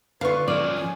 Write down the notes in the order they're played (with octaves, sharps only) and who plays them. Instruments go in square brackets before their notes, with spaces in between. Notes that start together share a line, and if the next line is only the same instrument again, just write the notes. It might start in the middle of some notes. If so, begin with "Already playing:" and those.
[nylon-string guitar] D3 F4 [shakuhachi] B4 [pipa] F5 C#6
[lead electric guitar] F3 C#4 [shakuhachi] F4 [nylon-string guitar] D5
[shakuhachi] G#5